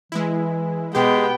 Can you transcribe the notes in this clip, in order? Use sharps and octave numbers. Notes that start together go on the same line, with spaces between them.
E3 G#3 E4
B2 G#3 B3 G4 G5